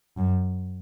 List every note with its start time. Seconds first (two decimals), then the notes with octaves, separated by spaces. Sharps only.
0.17 F#2